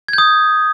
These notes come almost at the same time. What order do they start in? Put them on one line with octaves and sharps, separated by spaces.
G#6 G6 D#6